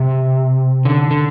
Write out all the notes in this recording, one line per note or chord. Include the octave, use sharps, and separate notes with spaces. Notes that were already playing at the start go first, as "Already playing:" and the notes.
Already playing: C3
D3
D3